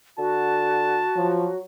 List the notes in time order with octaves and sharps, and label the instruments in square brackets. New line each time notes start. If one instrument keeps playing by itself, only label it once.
[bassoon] D3 [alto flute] F#4 [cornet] A5
[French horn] F3 [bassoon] F#3